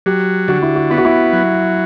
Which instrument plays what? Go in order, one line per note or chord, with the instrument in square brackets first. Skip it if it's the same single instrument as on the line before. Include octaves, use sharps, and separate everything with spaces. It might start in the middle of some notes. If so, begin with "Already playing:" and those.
[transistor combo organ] F#3 [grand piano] G4
[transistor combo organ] D3 [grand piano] F#4
[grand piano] E4
F#4
[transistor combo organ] B3 [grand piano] E4
[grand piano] F#4
E4
[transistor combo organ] F#3